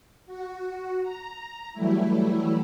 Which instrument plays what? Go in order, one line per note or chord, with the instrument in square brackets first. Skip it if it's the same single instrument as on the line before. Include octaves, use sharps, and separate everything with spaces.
[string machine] F#4
A#5
E3 F#3 G3 A3 E4